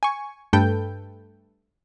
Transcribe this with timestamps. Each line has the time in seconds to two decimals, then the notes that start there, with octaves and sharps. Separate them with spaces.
0.03 G#5 C#6
0.53 G2 A3 A4 B4 G5 G6